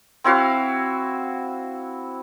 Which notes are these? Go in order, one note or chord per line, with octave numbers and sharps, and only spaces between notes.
C4 E4 F#4 F5